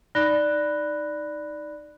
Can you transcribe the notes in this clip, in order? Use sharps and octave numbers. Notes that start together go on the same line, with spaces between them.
D#4 D5 B5 F#6 A#6 G7